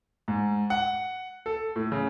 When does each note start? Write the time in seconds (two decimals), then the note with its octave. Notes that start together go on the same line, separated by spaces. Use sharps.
0.28 G#2
0.70 F#5
1.46 A4
1.76 A2
1.92 C#3